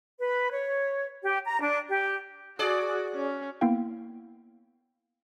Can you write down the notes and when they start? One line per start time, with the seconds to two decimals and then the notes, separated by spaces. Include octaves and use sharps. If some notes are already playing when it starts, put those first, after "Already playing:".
0.19 B4
0.51 C#5
1.22 G4
1.45 A#5
1.61 D4
1.89 G4
2.59 F#4 G#4 D5
3.15 C#4
3.61 A#3 B3 E4 F5 G5